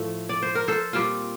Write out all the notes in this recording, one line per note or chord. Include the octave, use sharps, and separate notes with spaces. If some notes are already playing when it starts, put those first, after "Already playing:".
Already playing: A2 F3 A3
D5
C5
A#4
A4 C5
A#2 G3 C4 F4